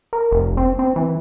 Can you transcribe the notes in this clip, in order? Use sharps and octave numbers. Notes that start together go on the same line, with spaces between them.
A#4
F1
C4
C4
E3